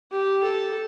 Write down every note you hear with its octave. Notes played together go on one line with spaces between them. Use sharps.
G4
A4